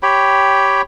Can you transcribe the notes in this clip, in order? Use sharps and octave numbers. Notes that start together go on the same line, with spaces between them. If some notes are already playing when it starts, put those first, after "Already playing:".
G4 C#5 G5 B5